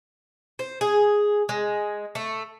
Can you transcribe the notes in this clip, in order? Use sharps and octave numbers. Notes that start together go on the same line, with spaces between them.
C5
G#4
G#3
A3